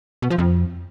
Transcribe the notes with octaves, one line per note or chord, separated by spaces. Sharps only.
B2
F3
F2